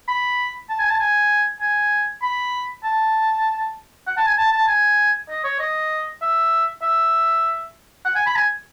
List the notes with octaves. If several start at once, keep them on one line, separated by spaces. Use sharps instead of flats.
B5
A5
G#5
A5
G#5
G#5
B5
A5
F#5
A5
G#5
A5
A5
G#5
D#5
C#5
D#5
E5
E5
F#5
G#5
B5
G#5